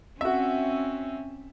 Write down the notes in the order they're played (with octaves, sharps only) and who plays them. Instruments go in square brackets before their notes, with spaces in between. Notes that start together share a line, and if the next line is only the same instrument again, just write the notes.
[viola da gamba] C4 C#4 [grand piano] F#4 E5